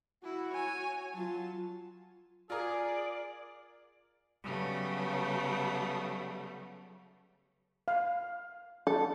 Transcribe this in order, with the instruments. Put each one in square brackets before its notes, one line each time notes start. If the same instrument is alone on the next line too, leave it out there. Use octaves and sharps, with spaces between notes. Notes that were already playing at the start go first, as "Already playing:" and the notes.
[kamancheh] E4 [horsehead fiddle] F#4
[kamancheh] C#5 G#5
[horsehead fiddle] F#3 F4 [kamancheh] A5
[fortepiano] F4 A#4 [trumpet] G#4 [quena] D5
[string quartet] C#3 F#3 G3 A3 B3
[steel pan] F5
[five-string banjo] A4